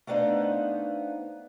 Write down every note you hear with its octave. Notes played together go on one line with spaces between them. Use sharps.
A3 B3 D4 D#4 C5 F5